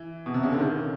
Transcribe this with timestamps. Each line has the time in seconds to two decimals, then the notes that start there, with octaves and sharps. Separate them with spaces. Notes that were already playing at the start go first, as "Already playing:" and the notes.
Already playing: E3
0.26 B2
0.34 C3
0.43 C#3
0.52 D3
0.59 D#3